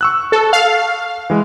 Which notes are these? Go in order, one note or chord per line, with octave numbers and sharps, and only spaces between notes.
C#6 E6 F#6
A4
F5
E3 G#3